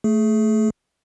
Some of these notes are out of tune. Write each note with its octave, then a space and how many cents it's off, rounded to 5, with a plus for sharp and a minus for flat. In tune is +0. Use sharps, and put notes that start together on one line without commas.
A3 +0 G#4 +25